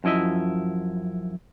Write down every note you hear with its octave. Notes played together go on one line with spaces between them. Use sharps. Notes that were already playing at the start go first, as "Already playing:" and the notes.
F#2 F3 E4 D#5 E5